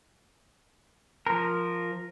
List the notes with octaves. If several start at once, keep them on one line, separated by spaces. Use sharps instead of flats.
F3 A#4